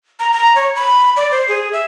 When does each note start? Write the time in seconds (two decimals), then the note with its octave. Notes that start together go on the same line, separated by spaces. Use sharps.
0.20 A#5
0.33 A#5
0.55 C#5
0.76 B5
1.17 D5
1.31 C5
1.48 G#4
1.73 E5